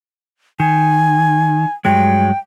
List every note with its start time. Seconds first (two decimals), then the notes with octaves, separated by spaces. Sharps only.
0.60 D#3 G#5
1.85 G2 F#3 G#3 G5